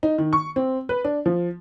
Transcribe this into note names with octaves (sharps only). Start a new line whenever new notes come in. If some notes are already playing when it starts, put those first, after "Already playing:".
D#4
D#3
C#6
C4
B4
D4
F3